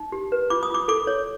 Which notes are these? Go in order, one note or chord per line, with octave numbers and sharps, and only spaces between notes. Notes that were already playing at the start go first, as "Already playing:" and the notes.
Already playing: D#4
G4
B4
F4 D6
D#6
F4 D6
A4 D6
C#5